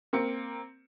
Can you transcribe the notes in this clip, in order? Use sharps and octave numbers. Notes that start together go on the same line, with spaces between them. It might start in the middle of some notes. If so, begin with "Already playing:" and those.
A#3 C4 C#7